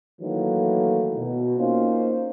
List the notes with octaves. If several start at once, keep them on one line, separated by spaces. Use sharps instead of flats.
D#3 E3 F#3 A3 A#3
B2
A#3 C#4 D#4 F4 C5